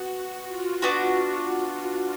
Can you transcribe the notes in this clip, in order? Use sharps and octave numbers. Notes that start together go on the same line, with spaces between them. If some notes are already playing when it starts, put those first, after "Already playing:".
Already playing: B3 F#4
F4
B3 D4 F#4